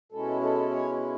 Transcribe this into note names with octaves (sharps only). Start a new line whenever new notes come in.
B2 G#3 C#4 E4 A4
A4
C#5